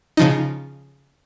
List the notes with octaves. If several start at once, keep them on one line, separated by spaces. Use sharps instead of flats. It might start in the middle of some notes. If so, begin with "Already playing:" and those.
C#3 F3 D#4